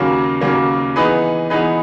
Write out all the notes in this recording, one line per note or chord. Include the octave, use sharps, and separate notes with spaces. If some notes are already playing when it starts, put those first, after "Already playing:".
Already playing: D#2 C#3 F#3 A#3
D#2 C#3 F#3 A#3
E3 B3 D#4 G#4 B4
E3 B3 D#4 G#4 B4